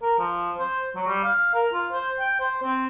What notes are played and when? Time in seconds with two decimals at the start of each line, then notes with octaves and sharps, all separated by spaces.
0.02 A#4
0.19 F3
0.58 C5
0.95 F#3
1.07 G3
1.24 F5
1.54 A#4
1.73 F4
1.92 C5
2.20 G5
2.40 C5
2.63 C4